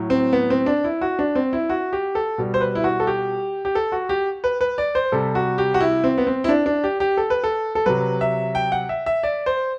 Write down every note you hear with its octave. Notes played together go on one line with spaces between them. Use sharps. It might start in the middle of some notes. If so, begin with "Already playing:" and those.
Already playing: A2 F#3
C4
B3
C4
D4
E4
F#4
D4
C4
E4
F#4
G4
A4
B2 G3
C5
B4
E4
F#4
A4
G4
G4
A4
F#4
G4
B4
B4
D5
C5
C3 G3 A4
F#4
G4
F#4
E4
C4
B3
C4
E4
D4
D4
G4
G4
A4
B4
A4
A4
C3 F#3 B4
E5
G5
F#5
E5
E5
D5
C5